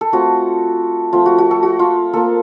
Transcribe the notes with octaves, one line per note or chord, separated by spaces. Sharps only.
A4
A3 C4 F4 F#4
F3 A3 C4 F4
F#4
F#4
A4
F#4
F4
A#3 F4 A4